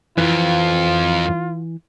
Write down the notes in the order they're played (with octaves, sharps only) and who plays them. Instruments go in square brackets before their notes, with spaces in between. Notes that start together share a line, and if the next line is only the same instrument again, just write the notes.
[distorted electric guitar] F2 [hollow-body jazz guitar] E3 [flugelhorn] F4